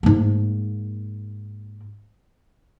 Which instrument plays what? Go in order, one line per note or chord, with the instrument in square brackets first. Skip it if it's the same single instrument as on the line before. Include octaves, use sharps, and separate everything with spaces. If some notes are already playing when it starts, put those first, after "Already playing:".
[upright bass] G#2 A#3